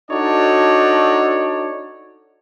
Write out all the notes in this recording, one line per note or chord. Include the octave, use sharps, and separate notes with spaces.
D4 D#4 F#4 A4 C#5 D5